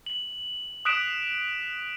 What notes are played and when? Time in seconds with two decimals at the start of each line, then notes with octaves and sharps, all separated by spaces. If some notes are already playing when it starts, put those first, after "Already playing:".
0.06 F#7
0.85 D#6 F#6 B6 D7 E7